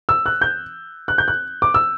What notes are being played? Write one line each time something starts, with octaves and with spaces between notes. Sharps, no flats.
E6
F#6
G6
F#6
G6
F#6
D6
E6